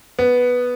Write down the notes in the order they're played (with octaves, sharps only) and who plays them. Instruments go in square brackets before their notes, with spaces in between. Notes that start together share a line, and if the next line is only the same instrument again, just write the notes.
[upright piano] B3